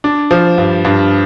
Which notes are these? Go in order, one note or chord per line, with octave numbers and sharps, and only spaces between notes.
D4
F3
G2
G2